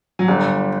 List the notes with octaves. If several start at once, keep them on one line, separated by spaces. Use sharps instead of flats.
F#3
G1 G3